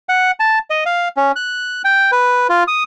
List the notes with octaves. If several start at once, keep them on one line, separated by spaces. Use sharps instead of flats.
F#5
A5
D#5
F5
C#4
F#6
G5
B4
F4
D#6